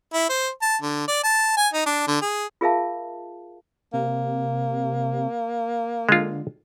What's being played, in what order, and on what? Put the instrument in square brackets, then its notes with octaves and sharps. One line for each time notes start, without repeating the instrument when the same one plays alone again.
[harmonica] E4
C5
A5
D3
D5
A5
G#5
D#4
D4
D3
G#4
[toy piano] F4 G#4 A#4 E5 F5 A5
[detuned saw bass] C3 [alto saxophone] A#3
[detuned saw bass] D3 [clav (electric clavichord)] G#3 F4